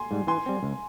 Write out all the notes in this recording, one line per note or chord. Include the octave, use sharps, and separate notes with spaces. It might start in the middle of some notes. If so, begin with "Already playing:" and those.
Already playing: G#5 C6
G#2 G3
E3 G#5 C6
G3 C4
C#2